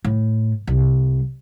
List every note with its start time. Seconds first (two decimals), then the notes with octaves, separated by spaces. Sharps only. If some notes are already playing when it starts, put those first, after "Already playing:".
0.05 A2
0.67 C2